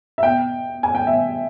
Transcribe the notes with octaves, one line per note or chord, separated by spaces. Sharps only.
E5
B2 G5
G#5
G5
B2 E5